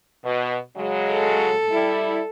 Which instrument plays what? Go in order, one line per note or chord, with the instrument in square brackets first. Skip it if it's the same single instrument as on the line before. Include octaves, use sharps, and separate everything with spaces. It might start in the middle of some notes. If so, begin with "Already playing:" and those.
[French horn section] B2
C#3 F#3 G#3
[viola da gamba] A4
[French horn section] G3 E4